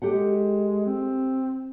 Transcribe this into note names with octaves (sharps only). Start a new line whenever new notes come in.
G#3 G4 A4 F#5
C4